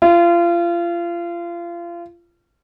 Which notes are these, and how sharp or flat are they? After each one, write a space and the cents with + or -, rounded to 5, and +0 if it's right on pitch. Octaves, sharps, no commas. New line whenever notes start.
F4 -30